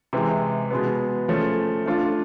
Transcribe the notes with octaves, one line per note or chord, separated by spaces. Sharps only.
C3 E3 G#3
B2 G#3 B3
F3 A3 C#4
A3 D4 F4